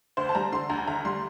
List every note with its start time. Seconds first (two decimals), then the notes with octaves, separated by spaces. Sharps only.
0.17 D2 C5
0.29 A5
0.35 G3 A#5
0.52 D3 C6
0.70 D2 A#5
0.87 D2 A#5
1.05 G3 C6